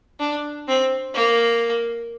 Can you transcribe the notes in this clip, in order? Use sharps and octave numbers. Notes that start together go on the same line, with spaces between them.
D4
C4
A#3